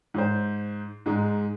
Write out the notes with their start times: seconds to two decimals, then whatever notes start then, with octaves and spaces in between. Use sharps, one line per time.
0.14 G#2 C5
1.06 G#2 G#3 D#4